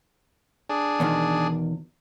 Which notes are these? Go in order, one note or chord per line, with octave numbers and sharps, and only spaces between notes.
D4 G#4
E2 B2 D#3